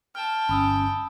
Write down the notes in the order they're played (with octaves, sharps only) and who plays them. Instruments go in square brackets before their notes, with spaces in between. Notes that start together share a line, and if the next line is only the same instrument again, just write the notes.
[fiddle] G5 A5 [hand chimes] F6
[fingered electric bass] G1 [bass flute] C#4 [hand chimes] B5 D#6 E6